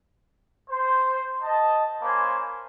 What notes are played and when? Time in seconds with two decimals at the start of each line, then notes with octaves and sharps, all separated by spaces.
0.70 C5
1.43 D#5 A5
2.02 A#3 C#4 C5 G#5 B5 D6